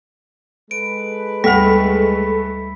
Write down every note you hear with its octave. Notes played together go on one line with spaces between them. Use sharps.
G#3 A4 B4 D7
D2 G3 A3 B5 B6